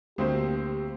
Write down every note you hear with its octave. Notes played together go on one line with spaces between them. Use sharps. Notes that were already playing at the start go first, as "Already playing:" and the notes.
D2 A#3 C4 G4 C5